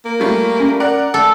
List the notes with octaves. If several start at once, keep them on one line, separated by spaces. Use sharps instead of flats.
A#3
G3 A3 F4
C#4
A#4 D5 F#5
A3 A4